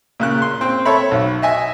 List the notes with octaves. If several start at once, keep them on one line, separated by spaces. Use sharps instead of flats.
A#2 C#3 F#6
C6
C4
A4 C#5 E5 B5
B1
D#5 E5 G#5